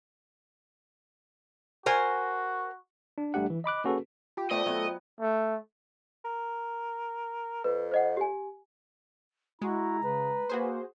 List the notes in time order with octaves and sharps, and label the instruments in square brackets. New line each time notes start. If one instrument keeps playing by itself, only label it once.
[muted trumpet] F#4 [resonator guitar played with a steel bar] A#4 C5 G#5
[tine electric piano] D4
A1 G3 A3 D4 G4 F#5
E3
D#5 B5 D6 F#6
A#3 C#4 F#4 G#4 A4 B4
[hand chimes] F4 [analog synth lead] G4
[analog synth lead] A3 [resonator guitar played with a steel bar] B3 D5 [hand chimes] F4 C5 G5 [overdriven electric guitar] D#5
[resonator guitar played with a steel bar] F#3 B3 [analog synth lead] A3
[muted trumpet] A3
[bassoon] A#4
[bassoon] F2 [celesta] B4
[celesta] C5 D#5 F#5
G4 G#5
[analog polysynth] G#3 [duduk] E4 [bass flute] F#4 [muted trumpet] A#5
[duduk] C#3 [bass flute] B4
[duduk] A#3 [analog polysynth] F#4 G#4 C5